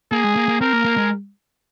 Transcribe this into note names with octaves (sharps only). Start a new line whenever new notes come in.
A#3 G#4
G#3
A#3
A#3
C4 A#4
A#3
A#3
G#3